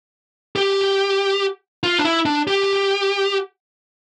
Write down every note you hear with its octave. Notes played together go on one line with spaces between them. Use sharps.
G4
F4
D4
E4
D4
G4